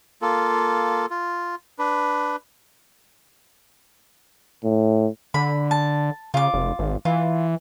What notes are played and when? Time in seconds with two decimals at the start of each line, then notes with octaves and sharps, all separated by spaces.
0.22 A#3 F4 A4
1.10 F4
1.79 D4 B4
4.64 A2
5.34 D3 B5
5.71 A5
6.34 C#3 F4 D6
6.54 F1
6.79 G#1
7.05 E3 F4